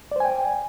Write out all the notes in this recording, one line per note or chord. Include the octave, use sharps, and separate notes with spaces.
C5 D5 G5 G#5